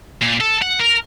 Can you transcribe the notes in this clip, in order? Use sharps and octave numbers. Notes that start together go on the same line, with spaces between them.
A#2
A4
F#5
A#4